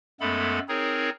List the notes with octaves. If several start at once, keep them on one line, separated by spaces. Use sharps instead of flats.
F#2 G#3 A3 B3 A4 B5
C4 D#4 G#4 A#4 C#5